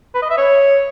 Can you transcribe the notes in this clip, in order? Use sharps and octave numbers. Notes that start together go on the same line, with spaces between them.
B4
D#5
E5
C#5